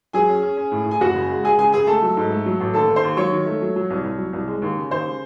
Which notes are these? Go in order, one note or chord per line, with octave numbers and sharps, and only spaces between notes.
F#3 G#4 G#5
C#4
C#4
C#4
A2
A2
G#5
F#1 F#4 F#5
C#3
G#3
G#3 G#4 G#5
C#3 G#4 G#5
C#3 G#4 G#5
A3 A4 A5
F#3
G#2
A3
F#3
A1
D#2 A4 A5
D#2
C5 C6
D#2
F#3 C#5 C#6
D#3
A3
F#3
F#3
C2
C2
F#3
C2
G#3
D#2
C#3
D#2 C5 C6
C#3